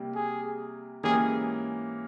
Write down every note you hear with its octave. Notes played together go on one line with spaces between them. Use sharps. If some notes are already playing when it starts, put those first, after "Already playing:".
Already playing: C3 G3 A#3
G#4
G#2 E3 A#3 C#4 G4 G#4